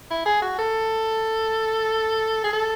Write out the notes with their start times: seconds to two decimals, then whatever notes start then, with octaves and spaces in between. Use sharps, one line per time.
0.10 E4
0.26 G#4
0.42 F#4
0.59 A4
2.44 G#4
2.53 A4